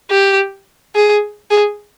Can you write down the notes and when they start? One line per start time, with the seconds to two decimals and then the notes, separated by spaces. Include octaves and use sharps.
0.10 G4
0.95 G#4
1.51 G#4